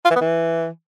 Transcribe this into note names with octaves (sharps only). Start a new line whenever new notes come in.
F4
E3
B3
E3